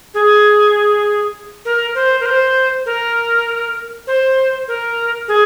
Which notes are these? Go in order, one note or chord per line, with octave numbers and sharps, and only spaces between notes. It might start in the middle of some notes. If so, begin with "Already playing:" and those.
G#4
A#4
C5
A#4
C5
A#4
C5
A#4
G#4